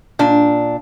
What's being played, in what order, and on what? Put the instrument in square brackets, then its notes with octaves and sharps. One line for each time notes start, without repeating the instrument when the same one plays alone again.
[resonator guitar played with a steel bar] A#2 D4